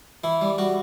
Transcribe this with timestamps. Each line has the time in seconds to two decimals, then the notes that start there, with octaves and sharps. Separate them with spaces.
0.24 E3 E4
0.41 G3
0.58 G3 F#4